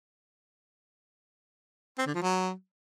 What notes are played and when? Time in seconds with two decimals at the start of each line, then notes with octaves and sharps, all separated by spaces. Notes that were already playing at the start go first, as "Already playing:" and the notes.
1.98 C4
2.06 D3
2.14 F3
2.22 F#3